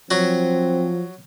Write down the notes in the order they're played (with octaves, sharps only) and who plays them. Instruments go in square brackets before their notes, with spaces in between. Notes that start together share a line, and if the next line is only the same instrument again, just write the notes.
[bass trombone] F3 [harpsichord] F#3 F#4 [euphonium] C4